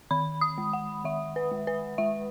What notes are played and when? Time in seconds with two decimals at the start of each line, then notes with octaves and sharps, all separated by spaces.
0.11 D#3 B5
0.41 D#6
0.58 G#3
0.73 F#5
1.04 D#3 E5
1.36 B4
1.51 G#3
1.67 B4
1.98 G#3 E5